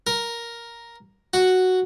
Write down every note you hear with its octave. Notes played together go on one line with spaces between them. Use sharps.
A#4
F#4